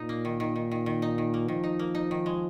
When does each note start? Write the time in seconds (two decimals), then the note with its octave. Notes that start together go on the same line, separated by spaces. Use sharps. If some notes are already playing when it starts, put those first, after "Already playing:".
Already playing: A#2 D#4
0.09 A#3
0.25 D#3
0.40 D#3
0.56 D#3
0.71 D#3
0.86 D#3
1.02 D#4
1.18 D#3
1.34 A#3
1.48 D#3 F3
1.64 D#4
1.79 A#3
1.95 D#4
2.11 D#3
2.26 G#3